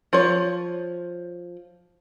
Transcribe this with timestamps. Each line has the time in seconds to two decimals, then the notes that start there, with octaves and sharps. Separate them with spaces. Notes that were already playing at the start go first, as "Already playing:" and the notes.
0.13 F3 C#5